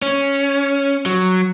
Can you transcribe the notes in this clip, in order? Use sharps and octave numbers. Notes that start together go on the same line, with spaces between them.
C#4
F#3